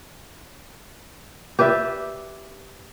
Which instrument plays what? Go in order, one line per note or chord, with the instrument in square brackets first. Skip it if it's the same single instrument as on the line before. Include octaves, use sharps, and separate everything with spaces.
[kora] G4 B4 D5 E5